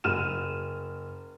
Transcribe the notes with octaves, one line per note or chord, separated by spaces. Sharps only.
F#1 F6 D#7 E7